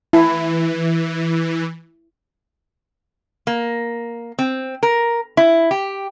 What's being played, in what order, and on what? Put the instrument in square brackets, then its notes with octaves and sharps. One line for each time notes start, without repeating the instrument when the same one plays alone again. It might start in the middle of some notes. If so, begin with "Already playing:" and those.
[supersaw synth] E3 [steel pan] E4
[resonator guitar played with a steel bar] A#3
C4
A#4
E4
G4